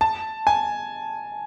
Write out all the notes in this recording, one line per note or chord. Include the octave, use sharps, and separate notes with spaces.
A5
G#5